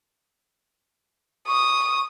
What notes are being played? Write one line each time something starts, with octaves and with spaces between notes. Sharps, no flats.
C#6 D#6